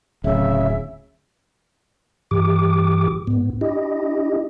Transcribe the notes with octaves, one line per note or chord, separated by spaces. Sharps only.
D1 C#3 E5
G2 E3 G4 D6
G#2 B3
D4 E4 G4 D#5